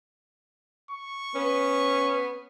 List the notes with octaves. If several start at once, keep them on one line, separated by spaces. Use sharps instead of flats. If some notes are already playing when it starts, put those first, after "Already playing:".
C#6
B3 C#4